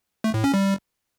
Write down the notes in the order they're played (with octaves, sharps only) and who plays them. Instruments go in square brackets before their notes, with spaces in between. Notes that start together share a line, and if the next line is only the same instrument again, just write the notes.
[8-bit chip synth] A3
A2
C#4
G3